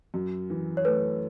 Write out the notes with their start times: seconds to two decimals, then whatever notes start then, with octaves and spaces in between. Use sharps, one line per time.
0.14 F#2
0.50 E3
0.77 C#5
0.85 A3 B4